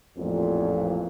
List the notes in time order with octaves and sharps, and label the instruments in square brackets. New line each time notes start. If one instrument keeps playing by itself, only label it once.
[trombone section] A1 F2 A#2